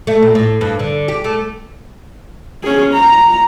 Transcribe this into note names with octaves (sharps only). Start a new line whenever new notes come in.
A3
A#2
A2
G2
D3
G4
A3
C#4 G#4
A#5